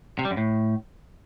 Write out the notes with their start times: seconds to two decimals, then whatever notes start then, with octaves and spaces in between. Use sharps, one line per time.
0.19 C3
0.25 G3
0.31 F#2
0.37 A2